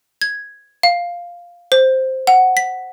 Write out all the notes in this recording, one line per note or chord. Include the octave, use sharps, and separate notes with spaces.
G#6
F5
C5
F#5
B6